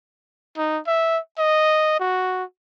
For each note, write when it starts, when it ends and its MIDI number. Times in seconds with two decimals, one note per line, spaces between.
0.57 0.79 63
0.87 1.19 76
1.38 1.97 75
2.00 2.44 66